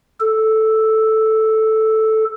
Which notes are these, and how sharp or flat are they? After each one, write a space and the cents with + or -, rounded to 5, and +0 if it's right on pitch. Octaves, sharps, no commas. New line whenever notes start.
A4 -5